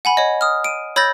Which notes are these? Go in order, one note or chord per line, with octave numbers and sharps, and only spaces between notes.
F#5 G#5 B5
C#5 D#5
D#6 F6
D7 D#7
C#5 B5 E6 G6 A6 A#6